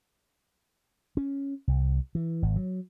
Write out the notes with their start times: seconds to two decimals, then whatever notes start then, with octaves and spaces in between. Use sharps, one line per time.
1.17 C#4
1.68 C2
2.15 E3
2.42 G#1
2.56 F#3